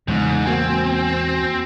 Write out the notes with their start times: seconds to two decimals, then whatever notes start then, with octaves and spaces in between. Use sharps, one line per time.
0.08 E2 G#2 C#3 G#3
0.46 A#3 C4 F#4 G#5